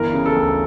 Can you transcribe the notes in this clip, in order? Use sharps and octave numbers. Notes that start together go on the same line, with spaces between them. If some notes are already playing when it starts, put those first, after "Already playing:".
Already playing: G1 E3 A#4
C#3
A4
D2